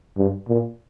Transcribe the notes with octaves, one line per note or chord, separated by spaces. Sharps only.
G2
A#2